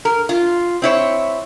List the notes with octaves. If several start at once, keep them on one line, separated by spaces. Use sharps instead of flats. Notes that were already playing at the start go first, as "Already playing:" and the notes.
A#4
F4
C4 E4 C#5